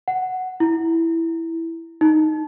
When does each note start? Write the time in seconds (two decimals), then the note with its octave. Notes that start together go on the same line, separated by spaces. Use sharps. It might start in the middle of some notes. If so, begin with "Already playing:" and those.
0.08 F#5
0.60 E4
2.01 D#4